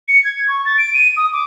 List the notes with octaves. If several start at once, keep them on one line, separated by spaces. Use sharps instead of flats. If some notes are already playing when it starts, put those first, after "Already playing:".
C#7
G#6
C#6
A6
D7
D#7
D#6
D6